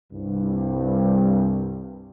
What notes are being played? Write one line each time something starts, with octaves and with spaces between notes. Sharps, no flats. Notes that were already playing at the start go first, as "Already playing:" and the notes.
C2 G2